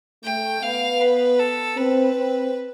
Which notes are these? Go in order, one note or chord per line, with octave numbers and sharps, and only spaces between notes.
A3 G5
B3 F5
B4
A4
C4 B4
C4